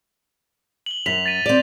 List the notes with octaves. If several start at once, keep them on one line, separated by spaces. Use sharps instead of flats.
F#7 G7
F#2 B6 F7
A6 B6 D#7
C4 D5